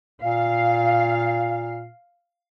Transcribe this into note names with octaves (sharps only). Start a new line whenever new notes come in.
A#2 F5